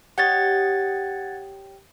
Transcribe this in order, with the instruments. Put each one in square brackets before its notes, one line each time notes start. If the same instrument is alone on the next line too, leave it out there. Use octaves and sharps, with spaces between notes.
[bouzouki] G4 C#5 D#5 [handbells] F#5 G#6 A6